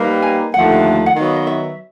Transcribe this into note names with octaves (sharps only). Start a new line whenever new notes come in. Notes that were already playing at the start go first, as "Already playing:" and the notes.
Already playing: G3 A#3 D#4 G4 B4
G#5
D#2 D3 F3 A3 F#5
F#5
D#3 F#3 B3 F5
D#5
E5